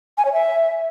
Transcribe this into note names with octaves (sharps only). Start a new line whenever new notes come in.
G#5
C#5
E5